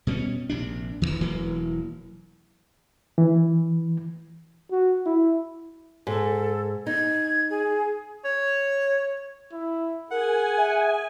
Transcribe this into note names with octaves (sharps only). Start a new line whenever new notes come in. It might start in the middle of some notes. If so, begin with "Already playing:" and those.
B2 G3 A3 C#4
A#1 C3 D4
E1 D2 A2 E3
E1 E3 F#3 A#3
E3
F#4
E4
G#2 A4
D#4 G#6
G#4
C#5
E4
G#4 A#4 F#5 G#5
E5